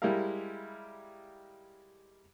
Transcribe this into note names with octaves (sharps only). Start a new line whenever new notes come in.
G3 G#3 E4 G4 A#4 F5